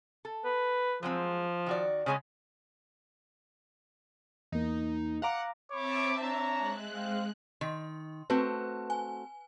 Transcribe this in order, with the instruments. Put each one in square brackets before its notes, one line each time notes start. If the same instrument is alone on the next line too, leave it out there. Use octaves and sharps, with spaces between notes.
[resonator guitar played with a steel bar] A4
[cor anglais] B4
[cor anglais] F3 [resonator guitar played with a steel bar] F#3 G#3 C4
[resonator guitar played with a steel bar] D#3 F#4 D5
[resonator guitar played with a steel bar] C#3 G#3 C#4 [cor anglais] C#5
[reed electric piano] E2 A#3 [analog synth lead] D#4
[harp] F5 A#5 D6 [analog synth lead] F#5
[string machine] C4 E5 A5 [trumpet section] C#5 B5 D6
[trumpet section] D4 C#5 A#5
[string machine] G#3 F#6
[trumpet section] C4 C5 F5
[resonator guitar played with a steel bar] D#3 [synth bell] C6
[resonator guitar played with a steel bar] A3 C4 F#4 [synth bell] B4
[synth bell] G#5